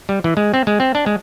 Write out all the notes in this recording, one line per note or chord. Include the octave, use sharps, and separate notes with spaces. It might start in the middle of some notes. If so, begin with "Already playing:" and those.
G3
E3
G#3
C4
G#3
C4
D4
G#3